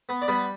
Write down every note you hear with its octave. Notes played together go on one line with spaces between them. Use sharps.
B3
D5
G3 B3 B4